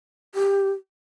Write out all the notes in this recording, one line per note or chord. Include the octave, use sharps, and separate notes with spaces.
G4